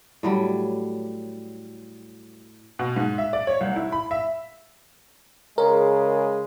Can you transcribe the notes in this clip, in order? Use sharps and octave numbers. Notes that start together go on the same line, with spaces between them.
A2 F#3 G3
B2
G#2
E5
D5
C#5
C2
E4
B5
E5
C#3 G#3 A#4